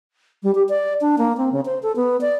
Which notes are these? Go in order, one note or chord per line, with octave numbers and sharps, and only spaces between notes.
G3
G4
D5
D4
A#3
C4
C#3
C5
A4
B3
D5